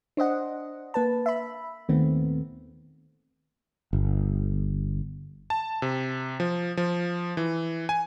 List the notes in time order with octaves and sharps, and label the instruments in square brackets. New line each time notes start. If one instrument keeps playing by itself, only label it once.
[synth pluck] D4 C5 D#5 F#5
A#3 B4 A5
E5 B5
D#2 A#2 D#3 A3 B3 C4
[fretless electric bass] G1
[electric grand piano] A5
C3
F3
F3
E3
G#5